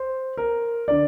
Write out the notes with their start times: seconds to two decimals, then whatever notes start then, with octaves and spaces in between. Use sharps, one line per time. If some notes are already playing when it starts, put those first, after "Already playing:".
Already playing: C5
0.37 A#4
0.88 D3 D5